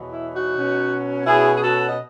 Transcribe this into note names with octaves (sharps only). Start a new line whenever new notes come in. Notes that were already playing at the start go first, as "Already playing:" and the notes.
Already playing: E2 B2 F#3
E4
D#4 F#4
B2 F#3 C#4
B2 F#3 C#4 E4 G#4
G#4
F#4 A4
D#5